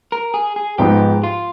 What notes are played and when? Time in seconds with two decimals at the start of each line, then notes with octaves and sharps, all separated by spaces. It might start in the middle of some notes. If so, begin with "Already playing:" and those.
0.12 A#4
0.34 G#4
0.56 G#4
0.78 G#2 F3 G#3 B3 D#4 G4
1.24 F4